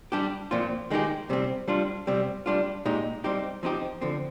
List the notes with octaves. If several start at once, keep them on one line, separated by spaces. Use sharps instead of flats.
G3 D4 G4
A#2 F3 C4 F4
D#3 G#3 D#4 G4
C3 G3 C4
G3 D4 F4
C3 G3 C4
G3 D4 F4
A#2 G#3 D#4 G4
G3 C4 D#4 G4
F3 C4 D#4 G4
D3 F3 C4